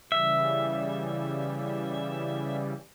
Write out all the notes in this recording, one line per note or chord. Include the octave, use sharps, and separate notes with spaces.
C#3 E3 G3 E5